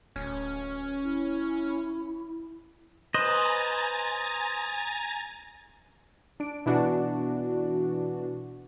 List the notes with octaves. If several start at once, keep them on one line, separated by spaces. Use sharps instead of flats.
D1 C#4
E4
B4 C5 D#5 G#5 A#5 A6
D4 D7
B2 E3 D4 F#4